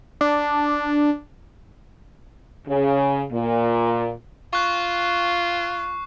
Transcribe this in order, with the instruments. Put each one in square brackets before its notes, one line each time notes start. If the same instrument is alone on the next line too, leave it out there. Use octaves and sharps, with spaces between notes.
[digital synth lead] D4
[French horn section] C#3
A#2
[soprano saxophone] F4 [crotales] C#6 F#6 C7